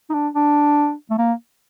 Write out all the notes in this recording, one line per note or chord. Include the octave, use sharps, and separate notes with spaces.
D#4
D4
D4
A3
A#3